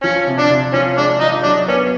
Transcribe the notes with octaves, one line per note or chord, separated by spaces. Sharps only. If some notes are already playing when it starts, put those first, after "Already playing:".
F3 C#4
C3
D4
C3
F3 C#4
G#3 D4
F3 D#4
F#3 D4
B3 C#4